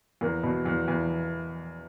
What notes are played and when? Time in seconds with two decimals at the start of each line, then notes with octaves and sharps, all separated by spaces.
0.21 E2 A#3
0.43 B2
0.66 E2
0.88 E2